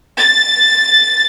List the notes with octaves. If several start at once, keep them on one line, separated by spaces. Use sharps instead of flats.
A6